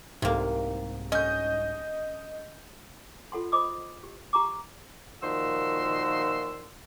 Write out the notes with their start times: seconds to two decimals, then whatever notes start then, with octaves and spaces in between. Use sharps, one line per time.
0.22 C2 G#2 C3 A#3
1.12 C#4 D#5 G6
3.32 F4 A4 F#5 C6
3.52 C5 D#5 B5 D6 D#6
4.04 G4
4.33 G4 A#5 C#6 D6
5.23 A#2 D#3 F3 F#4 C6 E6